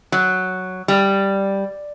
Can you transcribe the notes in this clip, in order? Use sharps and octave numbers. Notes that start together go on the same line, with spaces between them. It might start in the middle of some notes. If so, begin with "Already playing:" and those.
F#3
G3